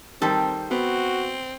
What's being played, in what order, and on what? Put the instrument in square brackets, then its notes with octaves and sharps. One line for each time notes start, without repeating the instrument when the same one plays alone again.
[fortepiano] D#3 G3 C5 [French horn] C4 [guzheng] A4
[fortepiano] B3 [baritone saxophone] C4 [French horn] F#4